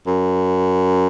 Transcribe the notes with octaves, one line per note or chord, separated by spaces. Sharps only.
F#2